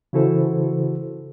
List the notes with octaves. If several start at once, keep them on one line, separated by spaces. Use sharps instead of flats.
C#3 E3 E4 F#4 A4 C5